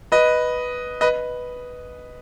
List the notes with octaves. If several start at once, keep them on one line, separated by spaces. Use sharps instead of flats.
B4 D#5
B4 D#5